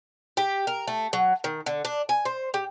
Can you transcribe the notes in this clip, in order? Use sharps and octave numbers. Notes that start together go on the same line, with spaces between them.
G4
A#4
A3
F#3
D#3
D3
D4
G#5
C5
G4